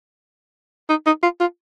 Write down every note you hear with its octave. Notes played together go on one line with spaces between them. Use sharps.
D#4
D#4
F4
F4